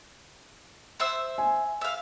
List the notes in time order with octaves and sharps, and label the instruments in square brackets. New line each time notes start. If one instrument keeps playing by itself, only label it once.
[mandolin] C5 E5 E6
[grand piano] G#5
[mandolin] E5 F5